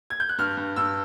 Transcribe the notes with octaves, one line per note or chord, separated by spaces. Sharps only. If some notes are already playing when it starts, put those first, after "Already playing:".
G#6
G6
F#6
G2 F6
G2
G2 E6